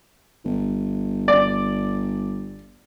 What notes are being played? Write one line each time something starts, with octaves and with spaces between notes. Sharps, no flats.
G1
D5